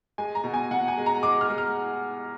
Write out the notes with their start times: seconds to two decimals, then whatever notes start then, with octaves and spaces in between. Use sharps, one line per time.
0.18 G#3 G#5
0.35 A#5
0.44 B2
0.54 G#5
0.71 B2 F#5
0.88 G#5
0.98 G#3
1.06 A#5
1.23 G#3 D6
1.41 F6
1.49 G#3
1.58 F6